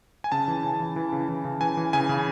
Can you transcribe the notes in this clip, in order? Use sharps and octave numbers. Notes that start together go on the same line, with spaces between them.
G#5
C#3 A5
E3
C#3
E3
E3
C#3
E3
C#3
E3 G#5
E3
C#3 G#5
C#3